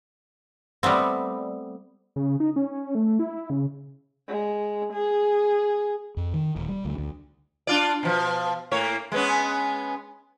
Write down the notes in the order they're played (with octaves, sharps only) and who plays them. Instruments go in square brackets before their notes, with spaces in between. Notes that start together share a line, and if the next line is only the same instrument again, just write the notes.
[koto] G3 A3 B3 C4
[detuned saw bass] C#3
D#4
C#4
A3
E4
C#3
[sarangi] G#3
G#4
[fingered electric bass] F2
D#3
D#1
G3
D2
D2
[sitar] D4 F4 D5
B2 F3
A2 A#3 C#5
G#3 B3 C#4